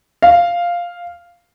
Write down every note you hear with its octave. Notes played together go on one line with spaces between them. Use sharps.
F5